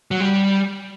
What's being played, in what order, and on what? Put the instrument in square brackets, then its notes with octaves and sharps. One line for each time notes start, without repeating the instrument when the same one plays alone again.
[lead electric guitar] F#3
G3